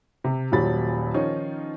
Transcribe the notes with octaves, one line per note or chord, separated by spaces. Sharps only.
C3
D#1 A#2 F#3 B5 A6
D#3 F3 C#4 D#4 F4